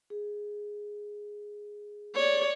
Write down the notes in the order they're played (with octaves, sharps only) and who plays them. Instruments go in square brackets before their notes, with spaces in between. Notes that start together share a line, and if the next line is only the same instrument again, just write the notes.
[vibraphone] G#4
[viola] C#5 D5